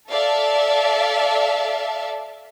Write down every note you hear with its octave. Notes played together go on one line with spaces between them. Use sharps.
A4 D5 E5 F5 A5